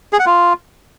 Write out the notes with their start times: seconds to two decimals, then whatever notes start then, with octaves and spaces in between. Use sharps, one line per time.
0.13 G#4
0.20 F#5
0.26 F4